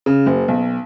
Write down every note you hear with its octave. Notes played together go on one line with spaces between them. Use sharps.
C#3
F#1
B1